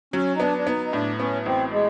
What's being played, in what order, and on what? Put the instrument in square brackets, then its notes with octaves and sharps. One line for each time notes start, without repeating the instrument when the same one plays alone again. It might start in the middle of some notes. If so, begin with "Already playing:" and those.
[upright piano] F#3 [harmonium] C#4
[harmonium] D#4
[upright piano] B3 [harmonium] D4
[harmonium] D4
[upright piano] B3 [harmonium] D#4
[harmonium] D#4
[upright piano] A2 [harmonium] D4
[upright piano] B3 [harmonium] C#4
[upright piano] A1 [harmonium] C4
[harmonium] G#3